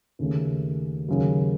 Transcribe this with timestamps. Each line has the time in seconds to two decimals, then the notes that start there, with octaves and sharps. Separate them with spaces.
0.19 D#2 C#3 A3
1.09 D#2 C#3 F#3